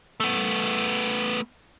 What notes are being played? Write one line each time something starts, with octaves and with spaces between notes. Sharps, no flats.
A3 B3